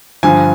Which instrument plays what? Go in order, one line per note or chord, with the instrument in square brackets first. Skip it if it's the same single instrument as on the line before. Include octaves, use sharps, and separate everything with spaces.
[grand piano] G2 D3 F3 G#5